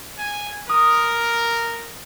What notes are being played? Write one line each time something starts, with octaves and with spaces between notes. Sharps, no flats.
G#5
A#4 D#6